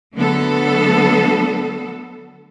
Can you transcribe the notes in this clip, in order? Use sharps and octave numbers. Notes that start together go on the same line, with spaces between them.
D3 F#3 A3 B3 A4